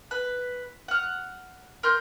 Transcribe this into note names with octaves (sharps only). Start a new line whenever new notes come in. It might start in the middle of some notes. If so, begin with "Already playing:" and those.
B4
F#5 F6
A#4 C6 G6